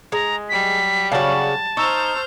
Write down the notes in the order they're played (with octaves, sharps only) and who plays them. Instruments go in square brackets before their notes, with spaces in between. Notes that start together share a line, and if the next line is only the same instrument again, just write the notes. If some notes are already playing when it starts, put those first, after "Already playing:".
[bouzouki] G#3 [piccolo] A#5
[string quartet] F#3 G3 [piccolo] B6
[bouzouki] C#3 F#4 [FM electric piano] C#5 D5 F5 [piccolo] A5
[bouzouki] D#4 [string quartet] C5 F6 G6 [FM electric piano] C#6 E6